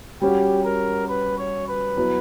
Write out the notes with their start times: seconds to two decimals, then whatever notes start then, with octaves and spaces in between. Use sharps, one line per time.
0.21 G3 C#4 F#4 G4
0.65 A#4
1.09 B4
1.38 C#5
1.68 B4
1.97 F#3 B3 E4